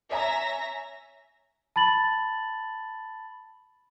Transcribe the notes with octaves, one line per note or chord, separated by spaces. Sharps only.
C#5 E5 G#5 A#5 A#6
A5 B5 A6 F#7